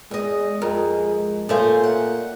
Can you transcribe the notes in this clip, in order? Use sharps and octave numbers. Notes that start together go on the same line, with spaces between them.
E2 G#3 D#5
F2 G#3 A#4 A#5
A#2 A3 C#4 A4 A#4 C5 F5
F#5